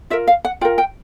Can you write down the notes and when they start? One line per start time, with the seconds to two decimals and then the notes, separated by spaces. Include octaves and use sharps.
0.10 F4 A#4 E5
0.27 F5
0.45 F#5
0.61 F4 G5
0.65 A#4
0.78 G5